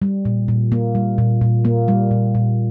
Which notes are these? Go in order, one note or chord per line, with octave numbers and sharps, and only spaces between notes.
G3
A#2
A#2
A#3
G3
A#2
A#2
A#3
G3
A#2
A#2